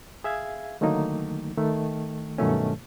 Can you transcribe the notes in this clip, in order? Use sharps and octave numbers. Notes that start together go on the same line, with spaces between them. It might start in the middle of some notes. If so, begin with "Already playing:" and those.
G#4 E5 F5 G#6
D3 D#3 F#3 A3 A#3 D#4
D#3 A3
G2 B2 D#3 F#3 A3 C#4